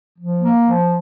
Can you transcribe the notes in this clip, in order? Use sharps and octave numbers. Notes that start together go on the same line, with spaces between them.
F3
A#3
F3